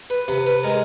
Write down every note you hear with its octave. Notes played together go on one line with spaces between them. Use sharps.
B4
C3 B4
B4
G#3 A#4